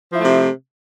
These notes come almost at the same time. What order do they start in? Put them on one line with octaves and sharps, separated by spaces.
F3 E4 A3 C3